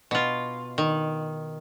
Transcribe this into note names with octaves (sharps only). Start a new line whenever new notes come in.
B2 F4
D#3